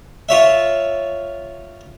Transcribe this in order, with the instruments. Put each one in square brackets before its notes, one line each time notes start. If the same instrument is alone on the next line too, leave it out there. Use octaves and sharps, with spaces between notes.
[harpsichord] F4 C#5 E5